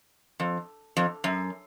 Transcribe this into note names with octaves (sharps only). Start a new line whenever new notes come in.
F2
F2
F#2